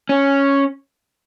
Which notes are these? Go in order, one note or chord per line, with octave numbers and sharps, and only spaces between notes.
C#4